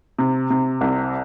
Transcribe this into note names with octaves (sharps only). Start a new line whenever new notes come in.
C3
C3
C2